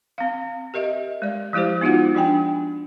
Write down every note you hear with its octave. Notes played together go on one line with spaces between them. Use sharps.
C4 F5
G4 A#4 D#5 E5
G#3 D5
F3 G#3 E4 G4 C5
B3 D#4 F4 F#4 F#5
F3 D4 G5 G#5